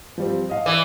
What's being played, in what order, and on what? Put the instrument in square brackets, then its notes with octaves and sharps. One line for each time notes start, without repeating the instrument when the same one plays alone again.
[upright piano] F3 G3 C4
D#5 F5
[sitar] E3 [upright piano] D5